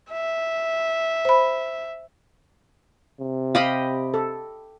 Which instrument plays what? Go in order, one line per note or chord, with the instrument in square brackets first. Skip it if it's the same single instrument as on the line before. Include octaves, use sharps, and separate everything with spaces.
[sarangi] E5
[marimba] C5 B5
[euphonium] C3
[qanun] G4 D#5 B5 [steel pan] F5
[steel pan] A4